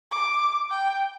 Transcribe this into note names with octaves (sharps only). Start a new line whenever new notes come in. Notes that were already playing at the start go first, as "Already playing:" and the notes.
D6
G5